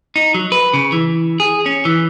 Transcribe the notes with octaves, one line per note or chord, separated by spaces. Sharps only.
D#4
F#3
B4
C#3
E3
G#4
C#4
E3